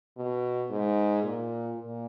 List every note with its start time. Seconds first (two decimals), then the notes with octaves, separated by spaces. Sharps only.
0.18 B2
0.70 G#2
1.22 A#2
1.76 A#2